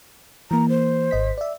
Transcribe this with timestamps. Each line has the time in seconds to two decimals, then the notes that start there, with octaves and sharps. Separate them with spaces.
0.51 E3 A#3 A#5
0.69 C5
1.11 G#1 D#5 B6
1.38 D5 E5